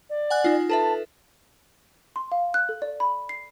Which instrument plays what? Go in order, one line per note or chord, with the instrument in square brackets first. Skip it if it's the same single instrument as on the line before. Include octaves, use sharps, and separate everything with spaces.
[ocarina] D5
[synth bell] F#5 G#5 F#6
D#4 F4
[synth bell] A4 B4 E5 [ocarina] A5
[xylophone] C6
F5
F#6
A4
D5
B5
C7